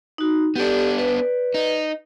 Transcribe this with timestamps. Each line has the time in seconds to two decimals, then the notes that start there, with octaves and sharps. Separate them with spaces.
0.18 D#4 F#4
0.56 B3 D4 G4 A4 D5
0.98 B4 D5
1.54 D#4